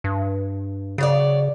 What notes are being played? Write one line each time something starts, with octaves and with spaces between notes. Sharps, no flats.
G2
C#3 F#3 C#5 D5